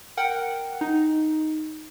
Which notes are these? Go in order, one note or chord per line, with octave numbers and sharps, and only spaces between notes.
A#4 F#5 G5
D#4